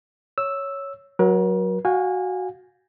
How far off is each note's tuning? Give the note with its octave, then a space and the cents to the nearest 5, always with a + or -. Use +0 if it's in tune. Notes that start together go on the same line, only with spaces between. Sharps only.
C#5 +0 E6 +0
F#3 +0 A#4 +40
F#4 +0 F5 +25 G#5 -25